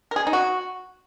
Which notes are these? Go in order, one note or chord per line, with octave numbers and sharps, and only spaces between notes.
A#4
G#4
D#4
F#4